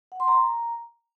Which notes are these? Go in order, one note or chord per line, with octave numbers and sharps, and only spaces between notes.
F#5
C6
A#5